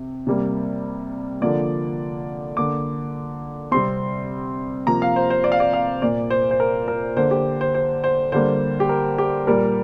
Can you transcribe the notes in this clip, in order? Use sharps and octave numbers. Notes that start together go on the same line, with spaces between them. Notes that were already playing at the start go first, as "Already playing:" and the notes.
Already playing: C3
C3 G3 A#3
D3 F3 A#3 D5
D3 A#3 D6
C3 G3 C4 C6
C3 F3 A#3 A#5
F5
C5
C5
D5
F5
D5
F5
A#2 A#3 D5
C5
C5
A#4
A#4
D3 A#3 C5
G4
C5
C5
C5
D3 G3 A#3 C5
G4
A#4
G4
A#2 G3 A#3 A#4